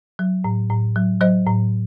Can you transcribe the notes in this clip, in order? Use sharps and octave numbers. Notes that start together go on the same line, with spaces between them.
F#3
A2
A2
F#3
F#3 C5 D#5
A2